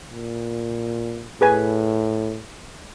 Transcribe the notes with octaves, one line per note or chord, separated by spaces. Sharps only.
A#2
A2 G#4 B4 G#5